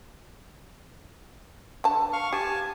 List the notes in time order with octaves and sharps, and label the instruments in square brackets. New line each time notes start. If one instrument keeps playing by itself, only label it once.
[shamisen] D3 A5
[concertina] F5 C#6 F6
[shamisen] G4 [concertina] G#5 A5